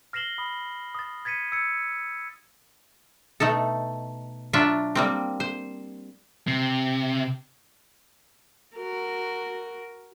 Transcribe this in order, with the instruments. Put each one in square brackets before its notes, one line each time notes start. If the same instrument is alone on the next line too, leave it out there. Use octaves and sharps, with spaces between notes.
[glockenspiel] F6 A#6 C7 E7 F#7 G7
B5 D#6
D#6 A6
G#6 A6 B6 C#7 D#7
E6 G#6 C#7
[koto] B2 A3 D#4 A4
F#3 D4 F4 E5
G3 A#3 C4
C5
[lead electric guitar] C3
[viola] F#4 A#4